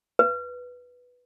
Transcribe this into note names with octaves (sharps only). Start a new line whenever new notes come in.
B4